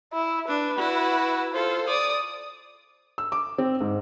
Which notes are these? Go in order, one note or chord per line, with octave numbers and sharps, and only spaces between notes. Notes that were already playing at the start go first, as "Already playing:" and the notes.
E4
D4 B4
E4 F#4
F4 A4 C5
D5 D#6
E6
D6
C4
G#2